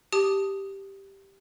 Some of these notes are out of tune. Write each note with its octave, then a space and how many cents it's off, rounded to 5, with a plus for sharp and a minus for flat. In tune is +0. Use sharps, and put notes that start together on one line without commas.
G4 +0 A5 +0 D#6 +0